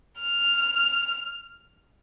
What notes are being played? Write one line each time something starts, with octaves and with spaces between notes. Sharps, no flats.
F6